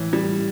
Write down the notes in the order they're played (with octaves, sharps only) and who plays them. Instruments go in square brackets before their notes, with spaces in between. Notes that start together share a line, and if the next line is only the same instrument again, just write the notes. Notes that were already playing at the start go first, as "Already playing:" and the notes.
Already playing: [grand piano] A2 E3
G3